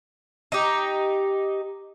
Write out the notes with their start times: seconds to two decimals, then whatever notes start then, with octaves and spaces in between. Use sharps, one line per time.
0.52 D#4 G4